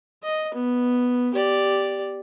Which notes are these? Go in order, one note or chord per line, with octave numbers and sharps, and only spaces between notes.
D#5
B3
G4 D5